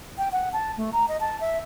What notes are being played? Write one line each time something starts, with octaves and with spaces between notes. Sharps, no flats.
G5
F#5
A5
A3
A#5
D#5
A5
E5